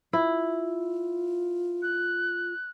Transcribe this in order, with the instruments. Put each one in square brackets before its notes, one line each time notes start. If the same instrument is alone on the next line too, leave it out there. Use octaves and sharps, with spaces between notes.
[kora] E4 [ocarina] F4
[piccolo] F#6